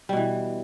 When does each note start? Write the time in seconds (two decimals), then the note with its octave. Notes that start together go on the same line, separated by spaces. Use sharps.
0.09 G3
0.13 B2
0.17 E3